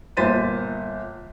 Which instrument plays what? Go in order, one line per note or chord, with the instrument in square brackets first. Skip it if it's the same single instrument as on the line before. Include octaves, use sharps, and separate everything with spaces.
[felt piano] G1 A#2 C5 A6 B6 D#7